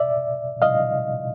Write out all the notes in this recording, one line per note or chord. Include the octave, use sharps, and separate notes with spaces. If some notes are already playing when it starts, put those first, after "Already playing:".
Already playing: D5 E5
D#5 F5